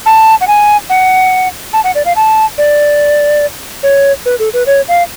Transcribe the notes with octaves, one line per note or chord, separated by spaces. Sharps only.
A5
F#5
G#5
F#5
A5
F#5
D5
F5
A5
D5
C#5
B4
A4
B4
C#5
F5